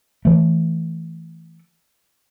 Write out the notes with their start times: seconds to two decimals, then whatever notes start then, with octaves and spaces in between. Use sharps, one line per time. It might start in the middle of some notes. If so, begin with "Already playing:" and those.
0.25 E3 A3